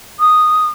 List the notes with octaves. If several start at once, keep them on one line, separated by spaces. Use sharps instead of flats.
D#6